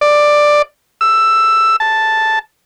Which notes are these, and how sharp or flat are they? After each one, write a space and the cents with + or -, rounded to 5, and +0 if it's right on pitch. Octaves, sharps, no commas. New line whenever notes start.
D5 +10
E6 +10
A5 +0